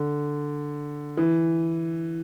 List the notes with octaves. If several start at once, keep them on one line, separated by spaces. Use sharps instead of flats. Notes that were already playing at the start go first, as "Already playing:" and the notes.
Already playing: D3
E3